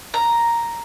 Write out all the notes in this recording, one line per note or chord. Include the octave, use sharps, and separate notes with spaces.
A#5